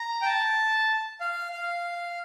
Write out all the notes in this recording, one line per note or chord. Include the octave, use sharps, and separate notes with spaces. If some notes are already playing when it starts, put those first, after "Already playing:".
Already playing: A#5
G5
A5
F5
F5